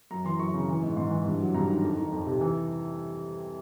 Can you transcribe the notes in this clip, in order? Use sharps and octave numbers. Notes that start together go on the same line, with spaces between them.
F#2 A#5
E3 C6
F#2 C#6
C#3
E3
G#2
G#2 C6
E3
G2
F#3
G2 A#5
D#3
F2
D#3
F2
C3
E3